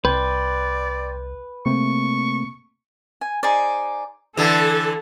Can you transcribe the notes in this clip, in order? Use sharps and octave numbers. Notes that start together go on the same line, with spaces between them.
C2 B4 D5 G5 C6 G6
C3 A3 A#3 C4 C#6
G#5
D#4 G#4 C5 D5
D3 E3 A4